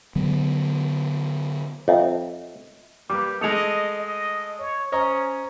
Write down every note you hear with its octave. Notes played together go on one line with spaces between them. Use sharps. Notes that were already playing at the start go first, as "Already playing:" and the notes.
D3 F#3 B3
F2 C#5 D#5 E5
G3 A#3 B4 D6
G#3 A3 D#5 D#6 C#7 F7
D#5
C#5
C#4 C5 C#5 D#5 A#5